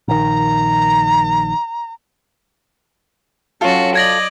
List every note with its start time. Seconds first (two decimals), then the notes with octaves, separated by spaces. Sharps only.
0.08 A#1 D#3 A#5
3.61 F#3 C#4 F4 F#4 A4
3.95 D5 D#5 G#6 A#6 F#7